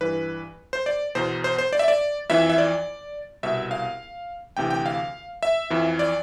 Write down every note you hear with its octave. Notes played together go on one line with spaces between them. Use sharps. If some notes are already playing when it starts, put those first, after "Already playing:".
G2 E3 B4
C5
D5
E2 B2 C5
C5
C5
D5
E5
D5
F2 E3 E5
E5
D5
C2 B2 E5
F5
D2 C3 E3 G5
G5
F5
E5
F2 E3
D5